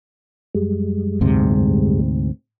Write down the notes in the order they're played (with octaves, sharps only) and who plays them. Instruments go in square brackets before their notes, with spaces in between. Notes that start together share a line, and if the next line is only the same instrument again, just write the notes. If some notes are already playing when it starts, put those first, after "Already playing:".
[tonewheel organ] F#2 G3 G#3
[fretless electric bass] D2 G#2 C3